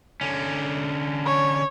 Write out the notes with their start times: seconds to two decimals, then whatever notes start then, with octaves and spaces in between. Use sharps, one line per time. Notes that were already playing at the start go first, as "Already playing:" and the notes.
0.21 D3 C#4
1.26 C#5